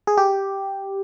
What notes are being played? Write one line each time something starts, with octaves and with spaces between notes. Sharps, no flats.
G#4
G4